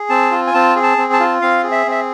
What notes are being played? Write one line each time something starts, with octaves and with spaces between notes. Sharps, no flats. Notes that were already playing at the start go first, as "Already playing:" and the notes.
Already playing: G#4
C4 A5
F4
G#5
C4 A5
G#4
A5
C4
A5
F4
C4 F5
G#4
E5
C4 E5